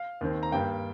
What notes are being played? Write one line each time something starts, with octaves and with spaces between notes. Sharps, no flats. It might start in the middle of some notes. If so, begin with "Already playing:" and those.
Already playing: F5
D#2 D#3 C4
A#5
G2 G3 A#3 G5